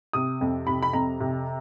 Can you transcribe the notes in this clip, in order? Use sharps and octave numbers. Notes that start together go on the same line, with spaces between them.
C3 D#6
F2
C3 B5
B5
F2 A#5
C3